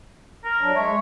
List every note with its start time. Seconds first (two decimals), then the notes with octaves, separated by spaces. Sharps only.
0.44 A#4
0.61 F#3 D4
0.76 G#3 C#5 E5